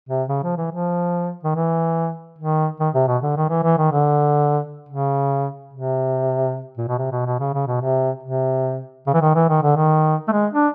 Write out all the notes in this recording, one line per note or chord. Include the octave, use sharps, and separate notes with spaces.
C3
C#3
F3
E3
F3
D#3
E3
D#3
D#3
C3
B2
D3
D#3
E3
E3
D#3
D3
C#3
C3
A#2
B2
C3
B2
B2
C#3
C#3
B2
C3
C3
C#3
E3
D#3
E3
D#3
D3
D#3
A3
G#3
D4